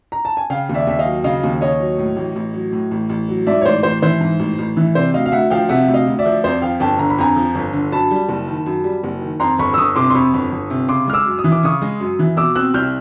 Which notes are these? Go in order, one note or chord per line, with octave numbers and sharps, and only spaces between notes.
A#5
A5
G#5
C#3 F5 G5
D#2
D5 E5
D#2 E5
D#5 F5
F#3
C#3 D#5 F5
D#2
D#2 C#5 D#5
F#3
A2
A1
A1
F#3
A2
A1
A1
F#3
G#2 D5 E5
C#5
A1 C5 D5
A1 C5
E3 C5
G#2
A1
A1
E3
C3 C5 D5
D2 D#5 F5
F5
D2 E5 F#5
F3 F5 G5
C3 E5 F#5
D2
D#5 F5
D2
D5 E5
F3
F2 C5 D5
F3 F5 G5
G1 G5 A5
D3 A#5
B5
F2 G#5 A#5
F3
G1
D3
F#2 A5 B5
G3
F#1
D#3
F#2
G3
F#1
D#3
F2 A#5 C6
G1 B5 C#6
E6
G1 C#6 D#6
C3 C6 D6
C6
F2 B5 C#6
G1
G1
C3
C#3 C6 D6
G#3 F6
D6 E6
F#2
D#6
E3
D6
C#3 C#6 D#6
G#3
F#2
E3
B2 D6 E6
C4 E6 F#6
C2 F6 G6